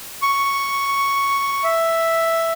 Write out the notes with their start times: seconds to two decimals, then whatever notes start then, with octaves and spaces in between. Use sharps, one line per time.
0.22 C#6
1.64 E5